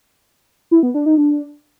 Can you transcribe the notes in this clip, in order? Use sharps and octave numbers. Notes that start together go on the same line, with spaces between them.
E4
B3
D4
D#4
D4